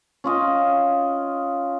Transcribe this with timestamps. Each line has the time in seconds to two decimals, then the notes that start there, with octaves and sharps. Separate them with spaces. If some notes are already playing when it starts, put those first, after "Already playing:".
0.24 C#4 F4 D#5